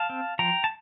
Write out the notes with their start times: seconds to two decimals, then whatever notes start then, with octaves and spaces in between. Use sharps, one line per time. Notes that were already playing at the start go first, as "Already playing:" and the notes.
Already playing: F5 A5
0.10 C4
0.39 F3 G5 A#5
0.64 A5